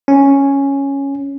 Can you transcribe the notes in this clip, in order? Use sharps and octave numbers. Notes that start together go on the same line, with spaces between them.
C#4